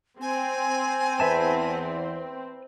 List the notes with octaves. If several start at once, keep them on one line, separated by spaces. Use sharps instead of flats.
C4 G#5
E2 E3 B4 E5 A5